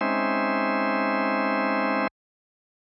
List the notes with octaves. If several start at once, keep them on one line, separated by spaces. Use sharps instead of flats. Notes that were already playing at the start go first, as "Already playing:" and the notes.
G#3 C4 C#4 D#4 C5 E5